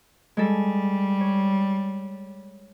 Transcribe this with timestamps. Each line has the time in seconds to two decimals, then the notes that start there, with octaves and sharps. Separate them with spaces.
0.37 G3 G#3 A4
1.21 C#5